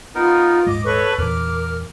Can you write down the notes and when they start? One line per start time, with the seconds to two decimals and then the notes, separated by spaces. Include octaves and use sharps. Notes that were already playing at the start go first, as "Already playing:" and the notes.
0.15 B3 D#4 F4 A#4
0.67 D#1 G#2 G#3 D#5 D6
0.85 A4 B4 C#5 C#6
1.18 E2 A#2 E3 A#4 D6 F6